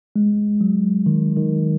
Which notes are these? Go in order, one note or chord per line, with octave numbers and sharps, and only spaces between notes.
G#3
F#3
D#3
D#3